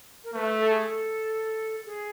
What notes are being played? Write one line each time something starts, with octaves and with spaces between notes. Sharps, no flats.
A#4
A3 B4
A4
G#4
A4
G#4